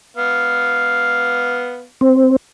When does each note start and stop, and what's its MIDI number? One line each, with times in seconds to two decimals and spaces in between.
0.17 1.85 59
0.17 1.85 77
2.01 2.36 60